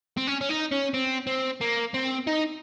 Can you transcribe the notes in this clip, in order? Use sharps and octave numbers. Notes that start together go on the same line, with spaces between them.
C4
C#4
C#4
D#4
C#4
C4
C4
A#3
C4
D#4